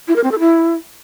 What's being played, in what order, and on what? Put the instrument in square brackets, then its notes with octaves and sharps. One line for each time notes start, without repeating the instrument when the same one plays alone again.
[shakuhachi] E4
A#4
C4
A4
E4